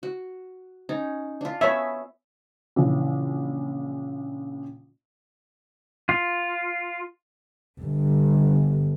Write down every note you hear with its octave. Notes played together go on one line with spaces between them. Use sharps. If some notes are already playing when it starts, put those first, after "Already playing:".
F#4
C#4 D#4
D4 F4
B3 B4 C#5 E5 G#5
A#1 C#3 E3
F4
G1